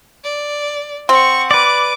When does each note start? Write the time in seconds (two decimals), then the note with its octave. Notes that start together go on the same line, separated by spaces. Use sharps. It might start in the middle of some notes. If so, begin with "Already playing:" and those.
0.24 D5
1.09 C4 F#5 C#6
1.51 B4 D5 D6